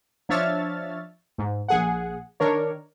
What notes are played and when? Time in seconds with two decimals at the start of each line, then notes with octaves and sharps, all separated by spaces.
0.29 F3 D4 C#5 E5 F6 A6
1.38 G#2
1.68 A#1 G#4 F#5
2.40 D#3 D4 A#4 C#5